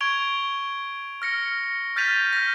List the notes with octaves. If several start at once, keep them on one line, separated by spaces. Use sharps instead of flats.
C#6 G#6 D7 F7 G7
F6 A#6 C#7
F6 G6 A6 B6 D#7 F7
F6 A#6